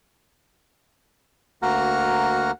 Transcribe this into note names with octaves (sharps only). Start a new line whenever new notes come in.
D2 A#3 F#4 F#5 A#5 F6